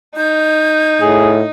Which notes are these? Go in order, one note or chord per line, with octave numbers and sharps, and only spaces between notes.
D#4 G6
A2 G#4